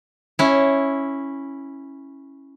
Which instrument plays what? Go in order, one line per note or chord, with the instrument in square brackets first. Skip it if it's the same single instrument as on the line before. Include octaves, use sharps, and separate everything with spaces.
[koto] C#4 E4